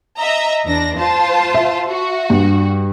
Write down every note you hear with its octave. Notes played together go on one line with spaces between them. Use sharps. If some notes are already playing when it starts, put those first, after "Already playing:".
D#5 E5 A#5
E2 D4 A#6
F4 C5 A5
E5
F#4
G2